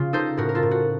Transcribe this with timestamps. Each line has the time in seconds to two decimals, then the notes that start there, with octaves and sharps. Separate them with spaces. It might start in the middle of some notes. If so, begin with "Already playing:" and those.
Already playing: C#3 F4
0.13 D#4 A4 C5
0.38 A2 F#4 A#4
0.49 A#4
0.55 F4 A4
0.63 A2
0.71 F#4